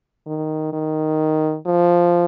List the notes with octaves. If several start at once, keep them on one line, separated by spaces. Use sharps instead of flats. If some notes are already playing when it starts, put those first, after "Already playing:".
D#3
D#3
F3